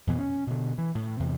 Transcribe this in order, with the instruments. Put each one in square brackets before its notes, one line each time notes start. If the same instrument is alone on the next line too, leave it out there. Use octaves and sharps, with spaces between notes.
[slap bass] F2 B2 E3
C#4
B2 D3
E3
A2
E2 C3